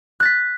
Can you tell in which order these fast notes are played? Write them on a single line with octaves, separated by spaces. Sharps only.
F#6 A6 B6